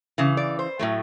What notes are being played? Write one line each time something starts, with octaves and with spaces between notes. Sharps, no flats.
C#3 E3
D5
C5
A2 F#3 A3